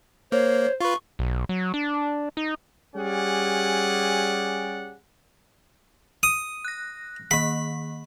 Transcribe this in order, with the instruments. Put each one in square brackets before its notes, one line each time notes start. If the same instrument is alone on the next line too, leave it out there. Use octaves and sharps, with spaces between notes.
[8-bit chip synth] A#3 [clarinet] C5 [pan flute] C#5
[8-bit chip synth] F4 B4 [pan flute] C#6
[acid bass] B1
F#3
D4
D#4
[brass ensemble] G3 C#4 G4 G#4 D5 F#5
[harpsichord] D#6
[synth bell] F#6 A#6
[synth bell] D#3 A#3 [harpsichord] B5